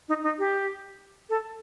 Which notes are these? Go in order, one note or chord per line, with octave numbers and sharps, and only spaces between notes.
D#4
D#4
G4
A4